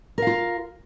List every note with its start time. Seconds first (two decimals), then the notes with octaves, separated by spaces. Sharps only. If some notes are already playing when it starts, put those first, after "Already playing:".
0.18 A#4
0.22 F5
0.27 F4